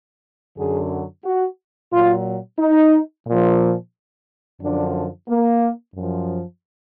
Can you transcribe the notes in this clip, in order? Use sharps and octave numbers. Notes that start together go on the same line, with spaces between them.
F#2 D3 F#3 G#4
F#4
A#2 F#3 F4
D#4
A#2 F3
F#2 D3 F3 D4
A#3
F#2 F3